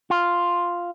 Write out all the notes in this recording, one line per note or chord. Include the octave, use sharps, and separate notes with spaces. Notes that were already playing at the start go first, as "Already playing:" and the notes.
F4